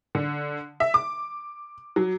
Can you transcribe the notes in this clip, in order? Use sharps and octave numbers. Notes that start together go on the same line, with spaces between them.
D3
E5
D6
F#3